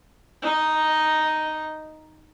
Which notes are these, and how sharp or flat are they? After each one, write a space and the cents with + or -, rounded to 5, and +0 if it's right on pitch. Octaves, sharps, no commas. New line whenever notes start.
D#4 +0 D#5 +0